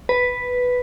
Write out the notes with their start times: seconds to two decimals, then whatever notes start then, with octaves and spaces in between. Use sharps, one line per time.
0.09 B4